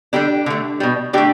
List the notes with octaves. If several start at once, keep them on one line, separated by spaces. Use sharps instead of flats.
D3 G3 D4 G4
D3 A3
B2 G3
D3 A3 D4 G4